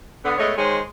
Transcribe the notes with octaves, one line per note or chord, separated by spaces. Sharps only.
D3 B3
G#3 A3 B3 C#5 D#5
D#3 G#3 C5 C#5